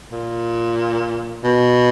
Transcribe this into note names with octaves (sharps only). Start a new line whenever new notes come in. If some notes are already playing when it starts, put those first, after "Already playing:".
A#2
B2